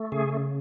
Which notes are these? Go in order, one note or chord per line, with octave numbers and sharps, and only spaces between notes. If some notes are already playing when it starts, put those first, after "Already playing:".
Already playing: A3
C#3 G#4